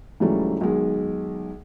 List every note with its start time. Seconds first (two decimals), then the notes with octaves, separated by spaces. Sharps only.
0.20 G#2 C#3 E3 F#3 G3 A3
0.61 B1 D#3 G#3